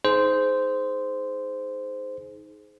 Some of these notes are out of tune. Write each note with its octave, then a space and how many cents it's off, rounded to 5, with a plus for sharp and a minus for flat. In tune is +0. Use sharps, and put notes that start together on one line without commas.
D#4 +15 G#4 +20 C5 -10